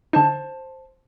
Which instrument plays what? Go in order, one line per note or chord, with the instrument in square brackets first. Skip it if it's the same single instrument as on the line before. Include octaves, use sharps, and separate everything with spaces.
[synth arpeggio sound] D3 D#4 [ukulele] C5 A5